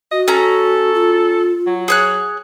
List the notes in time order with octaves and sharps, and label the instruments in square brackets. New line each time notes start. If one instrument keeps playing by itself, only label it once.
[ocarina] F#4 [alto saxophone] D#5
[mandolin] C#4 A#5 [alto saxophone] A4
[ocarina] F4
[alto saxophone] F#3
[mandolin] G#4 C#5 F#6